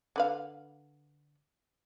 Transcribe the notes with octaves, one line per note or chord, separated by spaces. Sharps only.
D3 B4 F5